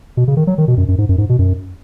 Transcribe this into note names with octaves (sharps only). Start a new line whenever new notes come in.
B2
C#3
D#3
F#3
D#3
B2
F#2
F#2
G#2
F#2
G#2
B2
F#2